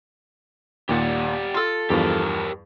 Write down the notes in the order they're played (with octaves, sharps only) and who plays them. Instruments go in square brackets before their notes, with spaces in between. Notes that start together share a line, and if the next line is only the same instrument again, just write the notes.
[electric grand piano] D#2 A#2 [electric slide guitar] G4 D5 F#5
[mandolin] F4 A4 [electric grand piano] C6
[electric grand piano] E2 G2 F3 [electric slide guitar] G4 A#4